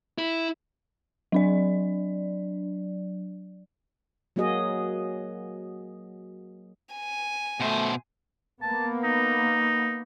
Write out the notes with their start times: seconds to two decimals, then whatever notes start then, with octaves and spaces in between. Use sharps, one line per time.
0.18 E4
1.32 F#3 D4 D5
4.36 F#3 A#3 F#4 G#4 D#5
6.95 G#5
7.60 B2 A3 C5
8.62 A#3 B3 A5
9.04 D#4